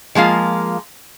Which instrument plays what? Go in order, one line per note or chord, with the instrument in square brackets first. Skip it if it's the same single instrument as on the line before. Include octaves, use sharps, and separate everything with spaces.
[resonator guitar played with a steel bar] F3 G#3 A#3 F4